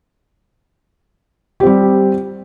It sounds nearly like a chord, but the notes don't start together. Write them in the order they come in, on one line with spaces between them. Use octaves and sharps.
G4 C4 G3